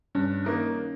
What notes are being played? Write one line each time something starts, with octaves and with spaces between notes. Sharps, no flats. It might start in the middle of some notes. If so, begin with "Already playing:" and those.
G2 C#4
D#3 A#3 D#4